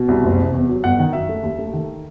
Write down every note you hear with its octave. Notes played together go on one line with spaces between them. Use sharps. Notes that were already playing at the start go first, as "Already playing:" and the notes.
Already playing: B2
C2
F#1
C3
E2
F#3
G1 F#5
D#3
F#2 E5
A3
D#2
A3
D#3